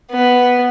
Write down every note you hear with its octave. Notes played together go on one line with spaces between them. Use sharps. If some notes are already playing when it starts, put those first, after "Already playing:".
B3